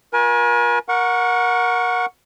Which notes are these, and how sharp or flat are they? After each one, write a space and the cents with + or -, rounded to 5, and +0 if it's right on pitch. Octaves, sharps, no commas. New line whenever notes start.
F4 +40 A#4 +45 G#5 +10
A#4 +15 F#5 -20 C#6 +0